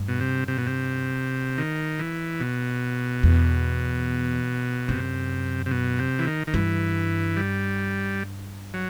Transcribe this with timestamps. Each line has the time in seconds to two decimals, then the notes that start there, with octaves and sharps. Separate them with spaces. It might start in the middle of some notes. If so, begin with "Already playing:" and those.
Already playing: G2
0.08 B2
0.20 C3
0.48 C3
0.58 B2
0.67 C3
1.58 D#3
1.99 E3
2.40 B2
3.23 E2
4.88 F#2 C3
5.66 C3
5.71 B2
5.99 C3
6.19 E3
6.27 D#3
6.47 D#3
6.54 G2 E3
7.37 G3
8.74 F#3